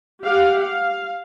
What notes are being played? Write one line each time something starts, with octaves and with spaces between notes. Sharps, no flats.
G4 F5 F#5
F5